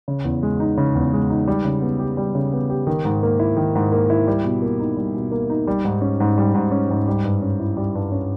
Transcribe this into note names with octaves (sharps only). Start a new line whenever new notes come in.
C#3
E2
G#3
D#4
C#3
E2
G#3
D#4
G3
C#3
B3
G4
G3
C#3
B3
G4
D#3
G#2
A#3
E4
D#3
G#2
A#3
E4
G3
B2
A#3
D#4
G3
B2
A#3
D#4
G3
G#2
C#4
G#2
G3
G#2
C#4
G#2
G3
G2
C#4
E4
G3
G2
C#4